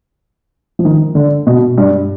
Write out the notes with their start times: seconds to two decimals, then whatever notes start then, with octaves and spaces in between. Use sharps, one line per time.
0.79 F3
0.85 D#3
1.15 D3
1.47 B2
1.78 G2